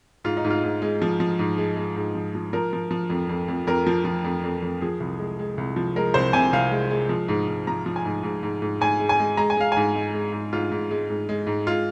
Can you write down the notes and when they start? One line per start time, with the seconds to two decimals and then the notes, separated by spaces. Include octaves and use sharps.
0.24 G#2 F4
0.37 D#4
0.45 G#2
0.50 F4
0.64 G#2
0.82 G#3
1.02 F3
1.20 F3
1.39 G#2
1.58 G#3
1.77 G#3
1.96 G#2
2.15 F3
2.35 F3
2.53 F3 A#4
2.73 F3
2.91 F3
3.10 F2
3.29 F2
3.48 F2
3.67 F2 A#4
3.87 F3
4.05 F3
4.24 F2
4.44 F2
4.62 F2
4.81 F3 G#4
5.00 C2
5.19 G#3
5.39 G#3
5.58 C2
5.76 F3
5.96 G#3 A#4
6.14 C2 C5
6.33 C3 G#5
6.53 C2 F5
6.71 G#3
6.91 G#3
7.09 F3
7.28 G#2
7.48 G#2
7.67 F3 A#5
7.86 F3
7.96 G#5
8.05 G#2
8.23 G#2
8.43 G#2
8.62 G#2
8.81 G#2 G#5
9.00 G#3
9.09 G#5
9.20 G#3
9.37 G#3 A#5
9.50 G#5
9.57 G#3 F5
9.72 G#2 G#5
9.95 G#3
10.14 G#3
10.32 G#2
10.53 G#2 F4
10.71 G#2
10.91 G#3
11.10 G#2
11.29 G#3
11.47 G#2
11.67 G#3 F4